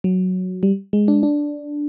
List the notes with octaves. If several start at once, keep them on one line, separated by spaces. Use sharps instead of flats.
F#3
G3
G#3
D4
D4